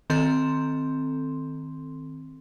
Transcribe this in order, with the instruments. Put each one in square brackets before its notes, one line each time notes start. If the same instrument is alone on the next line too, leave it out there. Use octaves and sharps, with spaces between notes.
[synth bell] D#3 C4 A4 C6